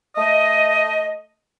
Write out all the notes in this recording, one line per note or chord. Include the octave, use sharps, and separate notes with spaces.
A3 D#5